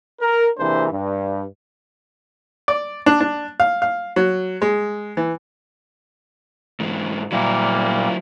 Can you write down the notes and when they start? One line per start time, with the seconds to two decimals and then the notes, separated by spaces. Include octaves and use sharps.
0.21 A#4
0.58 C3 E3 A#3 D4 G#4 C5
0.91 G2
2.68 D5
3.06 D4
3.20 D4
3.60 F5
3.82 F5
4.16 F#3
4.62 G#3
5.17 E3
6.80 G#2 E3
7.32 A#2 F#3 G3 A#3 E4